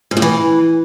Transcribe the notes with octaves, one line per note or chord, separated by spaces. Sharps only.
G#2
A2
E3